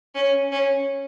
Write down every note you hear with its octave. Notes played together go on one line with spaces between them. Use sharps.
C#4
C#4